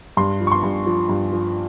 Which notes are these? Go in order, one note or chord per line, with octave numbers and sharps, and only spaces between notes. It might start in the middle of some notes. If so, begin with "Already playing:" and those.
G2 C6
F3
C#6
C6
G2
F3
G2
F3